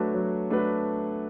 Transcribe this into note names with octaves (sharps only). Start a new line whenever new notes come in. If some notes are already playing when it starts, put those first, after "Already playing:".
Already playing: F#3 A3 D4 F#4 B4
F#3
A3 D4 F#4 B4